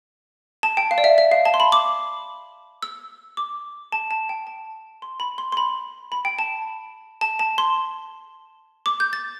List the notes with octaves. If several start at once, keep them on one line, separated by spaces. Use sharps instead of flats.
A5
G5
F5
D5
E5
E5
F5
A5
C6
B5
D6
E6
D6
A5
A5
G5
A5
C6
B5
C6
C6
B5
B5
G5
A5
A5
A5
C6
D6
G6
A6